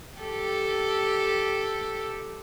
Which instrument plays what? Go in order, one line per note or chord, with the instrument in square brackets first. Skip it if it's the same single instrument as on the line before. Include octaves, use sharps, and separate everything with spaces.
[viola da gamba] G4 A4